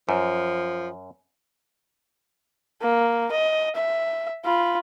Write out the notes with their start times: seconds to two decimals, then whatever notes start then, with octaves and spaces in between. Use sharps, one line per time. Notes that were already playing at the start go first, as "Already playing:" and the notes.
0.09 F#2 F3
2.82 A#3
3.32 D#5
3.76 E5
4.45 F4 B5